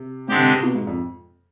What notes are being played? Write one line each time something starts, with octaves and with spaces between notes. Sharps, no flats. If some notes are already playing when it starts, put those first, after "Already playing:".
Already playing: C3
G#2 D3 G#3 C4 G4
C3
C3
B2
G#2
F2